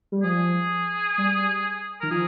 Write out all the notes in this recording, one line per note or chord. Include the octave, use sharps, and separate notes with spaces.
G3
F3 G#4
G3
D#3 A#4
F3 G#4